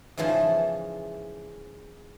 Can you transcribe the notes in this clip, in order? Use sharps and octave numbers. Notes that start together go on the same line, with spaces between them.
G#2 C#3 E3 F3 A5